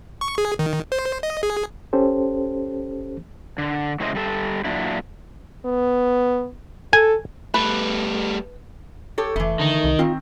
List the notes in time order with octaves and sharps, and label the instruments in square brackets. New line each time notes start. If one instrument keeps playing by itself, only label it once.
[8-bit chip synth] C#6
G#4
D#3
C5
D#5
G#4
[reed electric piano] C#4 G4 A4 C5
[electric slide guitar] D3
A2 C#3 G#3 E4 C5 D#5
G3 A4
A#2 F#3 D4 E4
[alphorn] B3
[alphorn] A4 [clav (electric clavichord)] G#5
[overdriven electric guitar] G3 A3 [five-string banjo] B4
[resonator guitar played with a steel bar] G4 A4 C#5
[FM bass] F1 [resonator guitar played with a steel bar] E3 A3
[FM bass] D3 [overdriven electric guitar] D#3 D#4
[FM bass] C2
[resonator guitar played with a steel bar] D#3 C4 [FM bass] F4